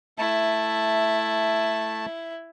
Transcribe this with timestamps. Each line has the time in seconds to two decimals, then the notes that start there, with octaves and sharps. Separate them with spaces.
0.19 A3 E4 A5